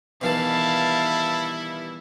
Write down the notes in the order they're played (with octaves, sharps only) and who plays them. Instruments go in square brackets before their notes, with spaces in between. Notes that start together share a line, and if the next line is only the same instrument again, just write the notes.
[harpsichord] B2 D#3 E3 [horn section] G3 E4 [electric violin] F5 A5